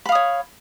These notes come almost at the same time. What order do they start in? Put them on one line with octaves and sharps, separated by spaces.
B5 F5 D#6 C#5